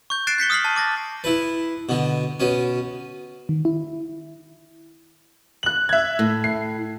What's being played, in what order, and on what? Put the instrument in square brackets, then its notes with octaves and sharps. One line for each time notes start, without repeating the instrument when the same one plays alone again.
[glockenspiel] C#6 G6
F#6 A6 C7 D7 E7
G6 B6 C#7 G7
D#6 F6 B6 C7 F#7
A5
D6 A6 A#6
[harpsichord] E4 B4
B2 D3
B2 C#4
[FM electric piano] D#3
E4
[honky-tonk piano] F#6 F#7
E5 G#6
[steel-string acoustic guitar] A2
[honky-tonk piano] C7